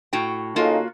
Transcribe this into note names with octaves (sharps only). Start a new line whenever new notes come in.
A2 F#4 G5
C#3 A#3 D#4 F4 F#4 A4